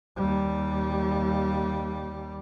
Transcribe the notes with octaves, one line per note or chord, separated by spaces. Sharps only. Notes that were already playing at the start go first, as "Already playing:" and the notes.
D#2 G3